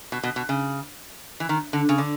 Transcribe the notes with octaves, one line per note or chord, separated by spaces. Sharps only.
B2
B2
B2
C#3
E3
D#3
D3
C#3
D3